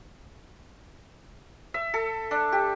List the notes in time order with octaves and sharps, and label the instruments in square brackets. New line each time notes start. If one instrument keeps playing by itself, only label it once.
[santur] E5
A4
D4
G4